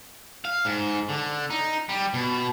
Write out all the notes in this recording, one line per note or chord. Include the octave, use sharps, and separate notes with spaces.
F5
G#2
D3
D#4
G3
B2